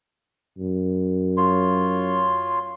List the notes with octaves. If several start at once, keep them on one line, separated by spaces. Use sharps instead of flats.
F#2
F4 C#5 C6